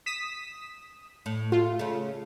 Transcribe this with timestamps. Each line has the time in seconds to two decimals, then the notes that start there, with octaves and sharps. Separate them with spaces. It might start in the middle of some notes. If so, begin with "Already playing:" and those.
0.06 D#6 B6 E7
1.26 A2
1.52 A3 F4
1.79 C#3 A3